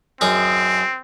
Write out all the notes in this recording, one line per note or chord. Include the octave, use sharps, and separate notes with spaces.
F#2 C4 D#4 G#4